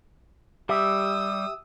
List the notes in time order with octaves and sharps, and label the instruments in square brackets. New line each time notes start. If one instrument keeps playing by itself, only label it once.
[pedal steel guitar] G3 [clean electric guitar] G4 E5 [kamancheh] D#6 E6